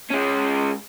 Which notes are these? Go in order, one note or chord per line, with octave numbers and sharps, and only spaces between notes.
G#3 C#4